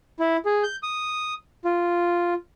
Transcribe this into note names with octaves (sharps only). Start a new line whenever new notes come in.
E4
G#4
G6
D#6
F4